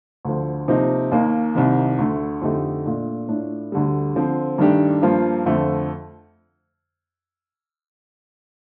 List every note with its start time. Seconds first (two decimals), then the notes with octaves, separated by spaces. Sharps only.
0.25 D2 D3 F3
0.68 C3 F3 A#3 D#4
1.12 D#2 D#3 A#3
1.55 C2 C3 D#3
1.99 D2 D3 A3
2.41 F2 D3 A3 D#4 G4
2.85 A#2 A3 D4
3.28 A2 A3 D4 F4
3.72 D2 D3 G3
4.15 D3 F3 C4
4.58 G2 D#3 A3 D4 G4
5.02 G2 F3 A#3 F4
5.45 F2 D3 F3 A3